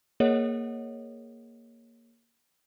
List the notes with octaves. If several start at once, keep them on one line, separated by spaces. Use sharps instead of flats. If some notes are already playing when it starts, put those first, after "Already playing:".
A#3 G#4 A#4 C#5 D#5 F#5